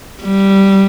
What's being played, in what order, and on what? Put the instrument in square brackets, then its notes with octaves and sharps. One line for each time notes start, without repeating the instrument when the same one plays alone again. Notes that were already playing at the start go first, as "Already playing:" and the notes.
[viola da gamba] G3